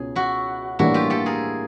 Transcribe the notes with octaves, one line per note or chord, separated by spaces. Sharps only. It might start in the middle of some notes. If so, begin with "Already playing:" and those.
Already playing: C#2 B2 C#4 G#4
E4 F#4
A2 E3 G3 A#3 D4 E4 F#4
F4 G4
G4 A4
G#4 A#4